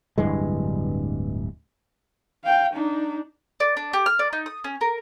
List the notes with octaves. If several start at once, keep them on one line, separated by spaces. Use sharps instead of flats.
D1 G2 E3 G#3
F5 G5
D4 D#4
D5
D4
G4
F6
D5
D#4
D#6
C#4
A#4